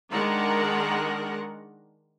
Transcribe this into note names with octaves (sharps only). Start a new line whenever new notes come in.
D#3 G#3 D4 A#4 F#5 A#5